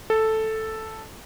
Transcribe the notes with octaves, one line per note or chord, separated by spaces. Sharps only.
A4